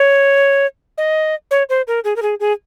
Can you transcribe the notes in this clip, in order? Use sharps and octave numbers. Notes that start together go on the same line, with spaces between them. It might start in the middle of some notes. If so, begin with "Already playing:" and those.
Already playing: C#5
D#5
C#5
C5
A#4
G#4
A#4
G#4
G#4